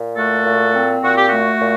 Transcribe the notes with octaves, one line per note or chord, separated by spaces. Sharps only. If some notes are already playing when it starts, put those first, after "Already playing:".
Already playing: A#2
A3 F#4 A4
A#2
C4
A#2 F#4
G4
A3 F#4
A#2